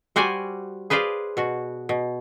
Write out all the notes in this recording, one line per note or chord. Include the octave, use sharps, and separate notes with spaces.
G3 F#4 C5 D5 G#5
G#4 B4 C5 D5 F5
B2 F#4
B2